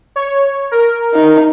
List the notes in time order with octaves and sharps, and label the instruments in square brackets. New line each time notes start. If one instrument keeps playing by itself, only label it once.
[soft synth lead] C#5
A#4
[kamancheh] D#4